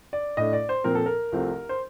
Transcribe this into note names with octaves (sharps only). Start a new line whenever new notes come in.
D5
A2 A3 D4 D#5
D5
C5
A#2 F3 C4 A#4
A4
A#4
C2 C3 F3 A3 C4
C5